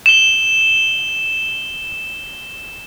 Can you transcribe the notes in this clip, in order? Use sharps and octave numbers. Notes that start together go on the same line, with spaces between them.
E7 G7